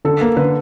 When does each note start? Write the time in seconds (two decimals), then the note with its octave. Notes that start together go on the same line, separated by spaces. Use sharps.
0.05 D3 A4
0.21 A#3
0.37 D3 B4